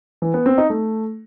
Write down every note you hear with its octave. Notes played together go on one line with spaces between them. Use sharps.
E3
B3
C4
D#4
A3